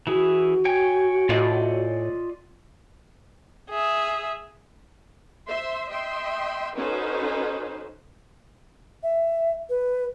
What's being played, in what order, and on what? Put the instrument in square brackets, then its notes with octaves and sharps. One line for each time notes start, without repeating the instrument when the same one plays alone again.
[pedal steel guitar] E3 E4 G#4 [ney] F#4
[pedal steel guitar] C#5 G5 G#5
[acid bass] A2 [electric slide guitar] F4 D5 D#5
[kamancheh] G#4 E5
[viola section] C5 E5 C6
D#5 E5 G5 C6
C#4 D#4 F#4 A4 B4 C5
[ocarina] E5
B4